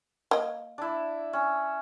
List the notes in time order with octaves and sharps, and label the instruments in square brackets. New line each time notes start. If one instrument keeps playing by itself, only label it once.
[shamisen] A#3 D#5
[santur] D4 E4
C#4